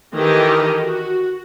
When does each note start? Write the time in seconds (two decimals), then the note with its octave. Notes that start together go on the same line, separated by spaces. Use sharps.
0.14 D#3 E3 G4 A4 A#4 D#5
0.81 F#4